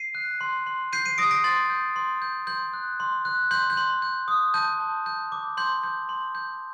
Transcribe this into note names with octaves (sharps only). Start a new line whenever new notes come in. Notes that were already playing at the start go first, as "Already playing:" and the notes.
Already playing: C7 D#7
F#6
C6
C6
G6 C7 D#7
C7 D#7
D#6 A#6 D7
A#6 D7
C6 A6
G6
C6
G6
C6 G6
F#6
C6
F#6
C6 G6
G6
C6
G6
D#6
A5 G6
A5
G6
D6
C6 G6
G6
C6
G6